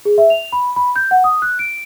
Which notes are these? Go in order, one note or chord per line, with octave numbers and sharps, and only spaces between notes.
G#4
E5
F7
B5
B5
G6
F#5
D#6
F#6
D7